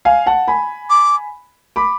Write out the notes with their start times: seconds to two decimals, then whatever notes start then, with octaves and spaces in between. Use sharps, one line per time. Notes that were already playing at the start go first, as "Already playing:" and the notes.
0.05 F5 G#5
0.26 F#5 A5
0.48 G#5 B5
0.90 D6
1.76 B5 D6